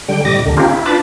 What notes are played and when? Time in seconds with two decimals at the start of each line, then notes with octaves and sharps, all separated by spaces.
0.08 D3 G3 G5
0.25 A2 C3 G3 D#5 D6 A#6
0.45 D2 D3 D#3
0.57 A#3 C4 C#4 D#4 F4 G4
0.71 E4
0.86 D4 F4 B4 A5 B5 D6